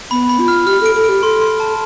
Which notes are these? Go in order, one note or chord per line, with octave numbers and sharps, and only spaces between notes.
B3 B5
B5
F4
F6
G4 F6
A4 D7
A4
G4 D7
A4 C6
C6
A5